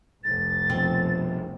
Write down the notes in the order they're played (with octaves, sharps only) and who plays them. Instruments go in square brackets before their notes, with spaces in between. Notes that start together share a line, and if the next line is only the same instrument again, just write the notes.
[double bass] F1 C2 [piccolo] A6
[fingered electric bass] B2 F3 [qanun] C4